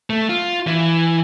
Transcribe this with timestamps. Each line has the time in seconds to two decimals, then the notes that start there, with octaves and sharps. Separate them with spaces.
0.10 A3
0.29 F4
0.67 E3